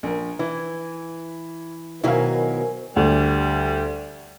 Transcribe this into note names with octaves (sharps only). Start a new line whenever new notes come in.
A#1 A#4
E3 E4
B2 D#3 F#3 E4 A#4 C5 F5 G#5
D2 G3